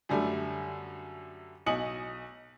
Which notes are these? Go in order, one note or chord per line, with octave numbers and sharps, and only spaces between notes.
F#2 D3 G3 A3
B1 D#5 G#5 D#6 C#7 F#7